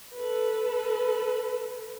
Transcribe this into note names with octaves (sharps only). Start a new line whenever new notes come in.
A4 B4